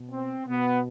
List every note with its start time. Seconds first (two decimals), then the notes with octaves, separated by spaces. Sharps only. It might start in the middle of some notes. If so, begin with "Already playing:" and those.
Already playing: B2
0.11 C4
0.47 B2 B3